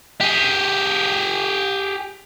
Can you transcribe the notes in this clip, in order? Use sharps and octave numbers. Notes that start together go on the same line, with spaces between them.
G4 G#4